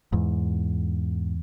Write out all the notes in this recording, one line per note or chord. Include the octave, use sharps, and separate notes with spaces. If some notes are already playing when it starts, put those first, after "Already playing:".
E2 G#2